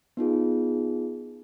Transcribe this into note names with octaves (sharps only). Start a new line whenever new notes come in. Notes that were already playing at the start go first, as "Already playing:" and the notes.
B3 D#4 F4 G#4